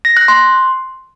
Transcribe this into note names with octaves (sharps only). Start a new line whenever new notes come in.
A#6
F#6
C6